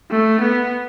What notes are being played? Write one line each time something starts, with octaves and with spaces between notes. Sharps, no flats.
A3
B3